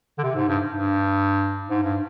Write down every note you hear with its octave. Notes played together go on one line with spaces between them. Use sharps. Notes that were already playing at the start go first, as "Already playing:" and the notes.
D3
C3
G#2
G2
G2
G#2
G2